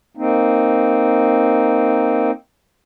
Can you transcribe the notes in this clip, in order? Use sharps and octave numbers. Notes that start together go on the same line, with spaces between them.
A#3 C4 D#4